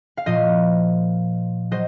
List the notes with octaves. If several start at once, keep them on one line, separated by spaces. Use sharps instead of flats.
F5
A#2 F3 C5 D#5
F#3 C5 D#5